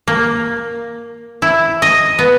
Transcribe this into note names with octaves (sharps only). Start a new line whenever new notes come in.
A#3
E4
D#5
B3